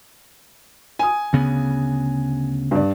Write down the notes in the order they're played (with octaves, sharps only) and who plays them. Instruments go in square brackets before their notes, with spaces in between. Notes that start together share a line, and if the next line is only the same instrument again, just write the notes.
[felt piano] G#5 D#6
[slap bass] D2 C#3 B3
[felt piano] G2 D5